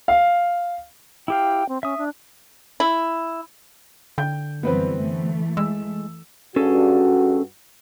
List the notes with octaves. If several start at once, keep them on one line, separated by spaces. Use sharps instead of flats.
F5
E4 G4 F5 G5
C4
C#4 E5 D#6
D4
E4
D3 G5 G6
F#2 E3 G3 B3 C4 B4
E3 A3
G#3 E6
G2 C#4 F#4 G#4 A4